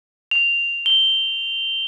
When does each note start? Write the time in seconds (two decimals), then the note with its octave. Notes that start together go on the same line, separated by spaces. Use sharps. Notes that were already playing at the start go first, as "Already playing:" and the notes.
0.31 F7
0.86 G7